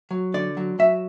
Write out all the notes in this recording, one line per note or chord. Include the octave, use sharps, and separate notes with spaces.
F#3
D3 D5
F#3
F#3 E5